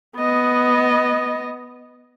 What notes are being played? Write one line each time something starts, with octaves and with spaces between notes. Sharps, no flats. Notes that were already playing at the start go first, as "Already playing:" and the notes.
B3 D#5